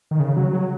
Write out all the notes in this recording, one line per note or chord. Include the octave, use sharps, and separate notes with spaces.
D#3
C#3
F#3
F#3